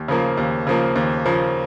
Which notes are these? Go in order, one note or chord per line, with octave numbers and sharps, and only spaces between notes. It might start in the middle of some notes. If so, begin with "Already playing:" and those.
Already playing: D#2
C#3 F3 A#3
D#2
C#3 F3 A#3
D#2
C#3 F3 A#3